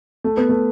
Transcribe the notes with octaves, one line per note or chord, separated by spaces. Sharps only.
A3
B3
A3